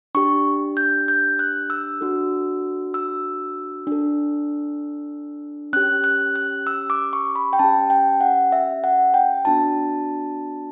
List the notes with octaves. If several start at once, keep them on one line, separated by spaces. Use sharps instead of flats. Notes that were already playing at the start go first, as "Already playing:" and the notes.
D4 G4 C#6
G6
G6
F#6
E6
D4 F#4 A4
E6
D4 A4
C#4 G4 F#6
F#6
F#6
E6
D6
C#6
B5
G5
C#4 G4 A5
G5
F#5
E5
F#5
G5
B3 D4 F#4 A5